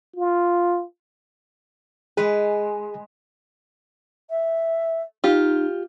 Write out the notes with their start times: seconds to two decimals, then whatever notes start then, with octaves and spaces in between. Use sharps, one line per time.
0.16 F4
2.17 G#3 G#4 B4
4.29 E5
5.24 D#4 F4 G4